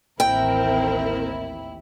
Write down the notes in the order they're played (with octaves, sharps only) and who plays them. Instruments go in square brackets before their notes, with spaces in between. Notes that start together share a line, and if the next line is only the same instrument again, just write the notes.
[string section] A1 D#2 E4 [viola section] C4 A#4 [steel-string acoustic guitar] G5